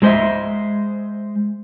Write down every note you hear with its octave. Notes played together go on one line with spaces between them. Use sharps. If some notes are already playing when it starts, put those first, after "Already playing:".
F#3 G#3 C5 D#5 E5